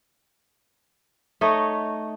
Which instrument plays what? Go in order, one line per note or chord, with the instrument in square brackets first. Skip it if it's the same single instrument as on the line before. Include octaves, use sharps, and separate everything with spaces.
[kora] A3 D#4 C#5 D#5